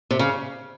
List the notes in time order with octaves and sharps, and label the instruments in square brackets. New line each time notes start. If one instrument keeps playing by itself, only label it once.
[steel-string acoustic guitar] C3
C#3